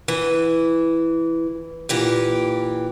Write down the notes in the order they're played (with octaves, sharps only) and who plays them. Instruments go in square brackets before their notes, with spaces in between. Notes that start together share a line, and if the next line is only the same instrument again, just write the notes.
[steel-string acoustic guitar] E3
A#2 E3 G4